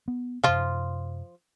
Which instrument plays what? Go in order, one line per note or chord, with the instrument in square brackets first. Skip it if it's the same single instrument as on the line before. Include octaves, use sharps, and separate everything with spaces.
[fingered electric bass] B3
[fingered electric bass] F#2 C3 [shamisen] F3 F4